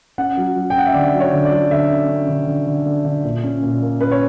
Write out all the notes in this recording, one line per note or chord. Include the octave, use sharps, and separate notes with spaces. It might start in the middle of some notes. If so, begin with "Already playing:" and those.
C#4 F#5
F#3
F#3
G5
C#4 F#5
E5
D3 D5
F#3
C#5
D3
D5
F#3
D3 E5
C#4
C#4
D3
D3
D3
D3
D3
A#2
C#4
A#2
A#3
C#4 B4
C#5